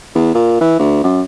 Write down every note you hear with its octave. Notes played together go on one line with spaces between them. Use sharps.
E2
A#2
E3
D2
F#2